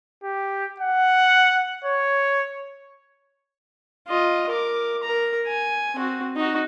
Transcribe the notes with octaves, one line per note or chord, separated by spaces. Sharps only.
G4
F#5
C#5
F4 D#5
A#4 D6
A#4 A#5
G#5
C4 F#4
D#4 F#4